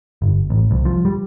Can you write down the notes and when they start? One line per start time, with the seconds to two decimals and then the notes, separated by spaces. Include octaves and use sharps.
0.22 G1
0.50 A1
0.71 C2
0.85 F3
1.05 G3